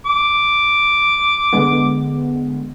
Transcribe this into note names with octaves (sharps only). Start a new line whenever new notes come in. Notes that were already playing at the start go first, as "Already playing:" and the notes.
D6
D3 G#3 B3